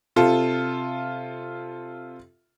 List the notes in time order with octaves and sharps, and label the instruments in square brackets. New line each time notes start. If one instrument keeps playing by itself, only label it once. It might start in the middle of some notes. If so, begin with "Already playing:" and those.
[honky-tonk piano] C3 F4 A4